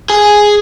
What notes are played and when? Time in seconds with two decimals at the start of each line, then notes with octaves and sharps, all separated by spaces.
0.10 G#4